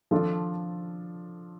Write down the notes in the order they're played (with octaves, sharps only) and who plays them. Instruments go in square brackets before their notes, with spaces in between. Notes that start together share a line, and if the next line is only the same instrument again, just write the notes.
[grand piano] F3 D4 F4 A4